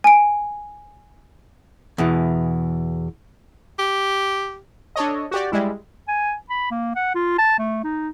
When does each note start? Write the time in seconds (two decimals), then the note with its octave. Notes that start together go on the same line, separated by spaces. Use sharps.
0.04 G#5 D7
1.98 E2 B2 E3
3.79 G4
4.96 D4 A4 C#5 D#5
5.31 F#4 G4 D5
5.52 G3 G#3 E4
6.08 G#5
6.50 B5
6.71 A#3
6.95 F#5
7.15 F4
7.38 A5
7.59 A3
7.84 D#4